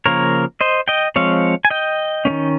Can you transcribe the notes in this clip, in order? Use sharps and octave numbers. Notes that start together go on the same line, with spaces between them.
C#3 F3 A#3 A#4 C#5
C5 D#5
D#5 G5
F3 G#3 C4 C#5 F5
G#5
D#5 G5
D#3 A#3 C#4